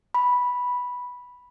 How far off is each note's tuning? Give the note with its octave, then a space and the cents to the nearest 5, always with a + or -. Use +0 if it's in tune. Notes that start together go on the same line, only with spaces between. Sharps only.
B5 -5